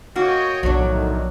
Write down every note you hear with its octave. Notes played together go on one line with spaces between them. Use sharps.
A#3 F#4 C#5 D#5 G5
B1 A2 D3 D#3 F3 F#3 D4